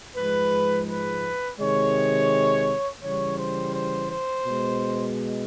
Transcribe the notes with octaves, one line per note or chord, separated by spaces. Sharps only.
G#2 F3 G#3 B4
B4
C3 D#3 G#3 C#5
C#3 E3 G3 C#5
C5
C5
C5
B2 G#3